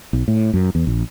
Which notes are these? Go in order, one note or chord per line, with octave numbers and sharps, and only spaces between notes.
B1
A2
F#2
E2
A#1